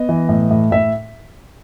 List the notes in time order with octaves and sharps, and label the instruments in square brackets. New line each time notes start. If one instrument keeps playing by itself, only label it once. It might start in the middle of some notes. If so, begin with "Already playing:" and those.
Already playing: [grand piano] B3 D#5
E3
A2
A2
A2 E5